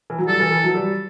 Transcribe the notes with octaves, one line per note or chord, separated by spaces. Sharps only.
E3
F#3
G3 A4
E3
E3
F#3
G3